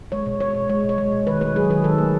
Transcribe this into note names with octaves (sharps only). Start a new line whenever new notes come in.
G#3 C#5
B2
G#3 C#5
B2
G#3 C#5
B2
C#5
G#3
B2
D#3 B4
A3 B4
F#3 G#4
D#3 G#4
D#3 A4
A3